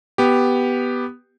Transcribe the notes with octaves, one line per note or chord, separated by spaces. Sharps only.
B3 G4